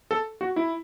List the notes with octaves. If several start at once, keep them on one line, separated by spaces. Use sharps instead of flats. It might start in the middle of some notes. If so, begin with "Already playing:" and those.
A4
F#4
E4